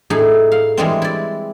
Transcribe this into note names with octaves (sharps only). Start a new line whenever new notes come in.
A2 D#4 E4 G#4
F5
E3 G3 G#3 C4
E4 D5